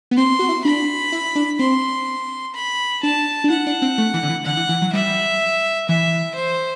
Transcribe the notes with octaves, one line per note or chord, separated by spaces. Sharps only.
B3
C4 C6
F#4
E4
D4 B5
E4
D4
C4 C6
B5
D4 A5
D4
E4 F#5
D4
C4
A3
E3
D3
E3
D3 F#5
E3
E3
F#3
G3 E5
E3 E5
C5